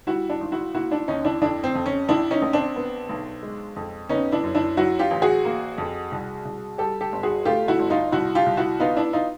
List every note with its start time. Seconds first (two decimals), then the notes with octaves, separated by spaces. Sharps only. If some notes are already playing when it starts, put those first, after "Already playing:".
0.07 G3 E4 F#4
0.29 D4 E4
0.41 G#1
0.52 E4 F#4
0.75 A#3 E4 F#4
0.91 D4 E4
1.08 D#2 C#4 D#4
1.25 D4 E4
1.41 F2 D4 E4
1.64 C4
1.75 F2
1.86 C#4
2.09 A#1 D4 E4
2.31 C#4 D#4
2.42 A#1
2.53 C4 D4
2.76 B3
3.09 B1
3.43 G#3
3.76 F2
4.09 B3 C#4 D#4
4.32 D4 E4
4.43 F#2
4.55 D4 E4
4.77 F#3 E4 F#4
4.99 F4 G4
5.11 A1
5.22 F#4 G#4
5.45 A#3
5.78 F2
6.11 C2
6.45 C2
6.78 G3 G4 A4
7.01 G4 A4
7.12 G1
7.23 F#4 G#4
7.45 A3 F4 G4
7.68 E4 F#4
7.79 G1
7.90 D#4 F4
8.12 C2 E4 F#4
8.35 F4 G4
8.46 C2
8.57 E4 F#4
8.80 B3 D#4 F4
8.96 D4 E4
9.13 D#4 F4